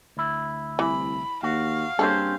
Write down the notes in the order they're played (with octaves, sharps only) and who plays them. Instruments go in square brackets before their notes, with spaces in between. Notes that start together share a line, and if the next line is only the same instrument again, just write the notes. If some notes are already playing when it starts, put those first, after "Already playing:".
[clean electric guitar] D2 E4
[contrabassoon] C2 [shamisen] E3 [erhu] B5
[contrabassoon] D#2 [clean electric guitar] F#4 [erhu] F5
[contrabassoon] G2 [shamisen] C#3 A#3 A4 [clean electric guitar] C4 C#4 C5